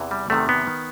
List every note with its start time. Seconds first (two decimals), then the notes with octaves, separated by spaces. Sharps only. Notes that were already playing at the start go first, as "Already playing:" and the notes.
Already playing: E2 C3 E3
0.11 G3
0.30 E2 C3 D#3 A3
0.49 B3
0.67 D#3